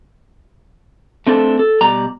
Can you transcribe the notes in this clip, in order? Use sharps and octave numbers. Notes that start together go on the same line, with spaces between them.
A3 C4 D4 A4
A4
B2 G3 D5 A#5